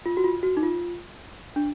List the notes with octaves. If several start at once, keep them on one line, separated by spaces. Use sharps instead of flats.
F4
F#4
F4
F#4
D#4
F4
D4